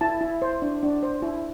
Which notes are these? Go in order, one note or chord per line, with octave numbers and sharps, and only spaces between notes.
E4 A5
E4
C5
D4
D4
C5
E4